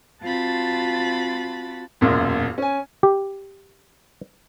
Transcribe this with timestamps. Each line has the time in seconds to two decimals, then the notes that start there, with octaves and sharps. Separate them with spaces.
0.23 C4 F4 F#4 A5 B5 A6
2.01 E1 A#1 F#2 A#2
2.58 C#4 G#5
3.03 G4